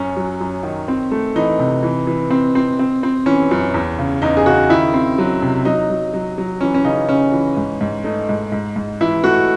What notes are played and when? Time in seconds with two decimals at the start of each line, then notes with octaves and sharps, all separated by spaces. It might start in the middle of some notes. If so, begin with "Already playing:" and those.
Already playing: F#2 C#4
0.17 F#3
0.41 F#2
0.63 D#3
0.88 C4
1.11 A3
1.36 E3 D#4
1.60 C3
1.83 E3
2.07 E3
2.30 C4
2.55 C4
2.79 C4
3.03 C4
3.26 E3 C#4
3.51 F#2
3.74 E2
3.99 C#3
4.22 E2 D#4
4.37 G#4
4.46 C#3 F#4
4.69 D#3 E4
4.94 C4
5.18 F#3
5.42 C3
5.65 F#3 D#4
5.90 F#3
6.13 F#3
6.38 F#3
6.61 E3 C#4
6.74 C#4
6.84 C#3 D#4
7.09 C#3 C#4
7.32 E3
7.57 G#2
7.81 G#2
8.04 A3 D#4
8.29 G#2
8.52 G#2
8.76 G#2
9.01 E3 E4
9.24 A3 F#4